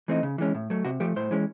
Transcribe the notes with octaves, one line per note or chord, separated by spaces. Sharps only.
E3 A3 C4 D#4
C#3
E3 G#3 C#4
A2
F#3 A3
C3 F#4
F3 A3 G4
A2 C5
E3 G#3 C#4